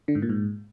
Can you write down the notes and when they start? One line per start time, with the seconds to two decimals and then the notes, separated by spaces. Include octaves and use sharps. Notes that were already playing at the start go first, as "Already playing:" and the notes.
0.08 D3
0.15 G#2
0.22 A#2
0.29 G#2